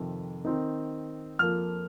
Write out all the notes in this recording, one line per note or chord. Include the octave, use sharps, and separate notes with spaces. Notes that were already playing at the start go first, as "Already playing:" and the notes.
Already playing: F2 C3 D#3
D#3 C4 D#4
F2 F3 A#3 F6